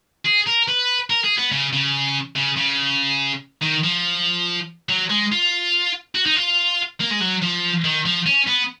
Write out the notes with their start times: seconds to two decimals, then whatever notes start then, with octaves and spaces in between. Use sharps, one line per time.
0.25 G#4
0.46 A#4
0.68 B4
1.10 A#4
1.24 G#4
1.38 B3
1.52 C#3
1.73 C#3
2.36 C#3
2.57 C#3
3.62 D#3
3.84 F3
4.89 F#3
5.10 G#3
5.32 F4
6.15 F#4
6.26 D#4
6.36 F4
7.00 A#3
7.11 G#3
7.21 F#3
7.43 F3
7.85 D#3
8.06 F3
8.26 C#4
8.47 B3